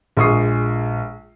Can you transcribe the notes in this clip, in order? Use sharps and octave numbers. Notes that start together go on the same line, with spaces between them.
A#1 G#3 C#6 D#6 C7